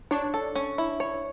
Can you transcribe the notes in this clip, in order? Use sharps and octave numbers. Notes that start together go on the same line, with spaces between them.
D4 C#5
A4
C#4
E4
C#5